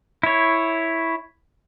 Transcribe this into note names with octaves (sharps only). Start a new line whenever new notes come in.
E4 C#5